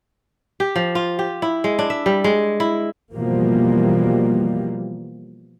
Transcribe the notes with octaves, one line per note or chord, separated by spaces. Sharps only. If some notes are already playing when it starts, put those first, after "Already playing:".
G4
F3
F4
G4
E4
G#3
D4
E5
G3
G#3
E4
B2 E3 F3 G3 A#3